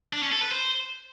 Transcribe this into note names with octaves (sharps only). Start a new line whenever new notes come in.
D4
C#4
A4
B4
C5